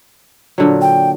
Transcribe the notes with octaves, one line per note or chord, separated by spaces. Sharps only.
A#2 D3 F#3
G5